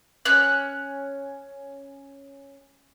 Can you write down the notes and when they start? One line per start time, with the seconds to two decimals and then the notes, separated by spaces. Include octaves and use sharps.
0.25 C#4 F#6